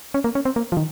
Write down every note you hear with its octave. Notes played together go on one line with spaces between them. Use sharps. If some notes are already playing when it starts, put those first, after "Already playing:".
C#4
A#3
C#4
C4
A#3
F3
D#3